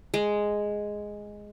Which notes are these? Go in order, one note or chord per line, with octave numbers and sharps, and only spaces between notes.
G#3